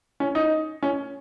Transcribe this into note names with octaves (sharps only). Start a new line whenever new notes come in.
C#4
D#4
C#4